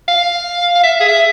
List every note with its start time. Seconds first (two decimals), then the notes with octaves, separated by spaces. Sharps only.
0.08 F5
0.75 F5
0.84 E5
1.00 G#4
1.08 E5